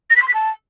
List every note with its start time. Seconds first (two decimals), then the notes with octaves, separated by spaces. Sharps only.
0.10 A#6
0.15 B6
0.21 C6
0.27 B6
0.33 A5